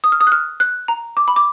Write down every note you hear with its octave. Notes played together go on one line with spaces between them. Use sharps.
D#6
F6
D#6
F#6
F6
F#6
A#5
D6
B5
D6